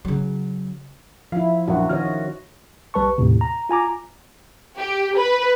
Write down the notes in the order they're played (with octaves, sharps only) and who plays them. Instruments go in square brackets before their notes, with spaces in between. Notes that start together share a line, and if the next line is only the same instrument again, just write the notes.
[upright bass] C#3 F#3
[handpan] F3 E4 [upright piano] F5
[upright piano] A#1 F#2 F#5 [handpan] F#4
[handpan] D#3 F#4 D#5 [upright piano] C#4 F6
[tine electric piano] B1 G3 B4 A5 C#6
D#2 A2 C3
A#5
F4 G#5 A#5 D6
[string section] G4
B4